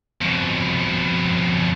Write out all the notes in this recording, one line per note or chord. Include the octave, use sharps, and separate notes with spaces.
F2 B2